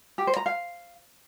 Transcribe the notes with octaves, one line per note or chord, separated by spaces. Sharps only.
G4
C5
A#5
F5